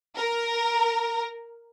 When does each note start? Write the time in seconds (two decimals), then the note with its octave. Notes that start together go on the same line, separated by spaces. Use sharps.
0.17 A#4